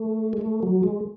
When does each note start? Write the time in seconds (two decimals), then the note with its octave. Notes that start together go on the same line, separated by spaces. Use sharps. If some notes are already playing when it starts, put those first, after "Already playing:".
Already playing: A3
0.33 G#3
0.41 A3
0.63 F#3
0.83 G#3